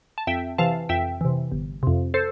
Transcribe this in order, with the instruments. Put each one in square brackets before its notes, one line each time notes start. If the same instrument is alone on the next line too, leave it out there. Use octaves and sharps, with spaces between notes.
[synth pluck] A5
F2 E5 G5
C3 E3 F5 A5
F2 E5 G5
C3 E3
G1
F2 C3
A4 C5